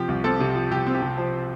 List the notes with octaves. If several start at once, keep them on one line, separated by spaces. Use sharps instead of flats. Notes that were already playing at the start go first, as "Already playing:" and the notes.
Already playing: C3 F3 G4
C2
C4 A4
C3
F3
C2 G4
C4
G4
C3
F3 C5